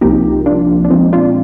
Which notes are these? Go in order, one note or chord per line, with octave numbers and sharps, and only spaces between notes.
C2 C3 F3 A#3 D#4 G4
D4 F4
D4
A#2 F3 G#3 C4 D#4
D4 F4